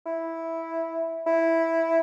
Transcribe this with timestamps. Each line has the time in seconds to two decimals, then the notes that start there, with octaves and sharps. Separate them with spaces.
0.06 E4
1.27 E4